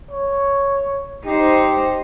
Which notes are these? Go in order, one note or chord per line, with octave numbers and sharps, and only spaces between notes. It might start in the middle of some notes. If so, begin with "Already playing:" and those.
C#5
D#4 G4 C5